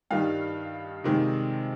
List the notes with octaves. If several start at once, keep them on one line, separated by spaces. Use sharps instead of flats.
G2 D#3 G3 F5
C3 D#3 G#3